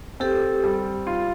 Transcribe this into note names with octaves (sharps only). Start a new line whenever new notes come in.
C4 G4 A4
G3
F4